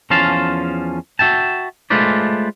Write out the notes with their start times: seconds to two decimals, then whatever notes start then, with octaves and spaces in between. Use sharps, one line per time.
0.10 E2 F3 C#4 F4 F5 A5
1.19 F#4 E5 G5 A5
1.90 G#3 A3 F4 B4 C5 D5